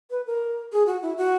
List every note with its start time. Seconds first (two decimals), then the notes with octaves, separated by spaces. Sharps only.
0.11 B4
0.27 A#4
0.72 G#4
0.87 F#4
1.02 E4
1.17 F#4